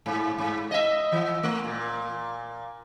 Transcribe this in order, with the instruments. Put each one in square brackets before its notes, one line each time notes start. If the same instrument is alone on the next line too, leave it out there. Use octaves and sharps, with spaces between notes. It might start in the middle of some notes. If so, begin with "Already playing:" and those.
[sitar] G#2
G#2
D#5 E5
E3
A3
A#2